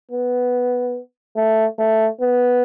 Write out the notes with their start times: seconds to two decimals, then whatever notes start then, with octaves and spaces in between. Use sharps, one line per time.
0.11 B3
1.37 A3
1.79 A3
2.21 B3